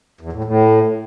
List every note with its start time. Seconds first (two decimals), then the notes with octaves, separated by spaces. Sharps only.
0.21 E2
0.33 A2
0.44 A2